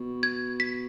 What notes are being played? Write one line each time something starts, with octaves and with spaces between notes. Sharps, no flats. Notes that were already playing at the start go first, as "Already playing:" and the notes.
Already playing: B2
G#6
B6